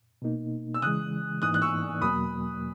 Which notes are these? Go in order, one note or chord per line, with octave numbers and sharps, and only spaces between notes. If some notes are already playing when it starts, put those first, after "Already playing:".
B2 A#3 D#4
E6
C#3 E3 G#3 D#6 F#6
G#2 E3 A#3 D#4 D#6 F#6
F#6
C#6 E6
E2 B2 F#3 A#3 B5 D#6